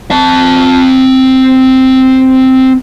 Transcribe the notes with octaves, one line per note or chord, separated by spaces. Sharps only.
C4 A5